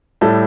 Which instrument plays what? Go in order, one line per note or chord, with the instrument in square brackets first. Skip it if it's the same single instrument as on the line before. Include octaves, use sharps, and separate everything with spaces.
[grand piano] A2 G3 A4